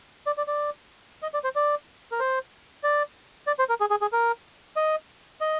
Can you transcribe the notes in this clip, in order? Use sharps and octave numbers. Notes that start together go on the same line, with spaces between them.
D5
D5
D5
D#5
D5
C5
D5
A#4
C5
D5
D5
C5
A#4
G#4
G#4
G#4
A#4
D#5
D#5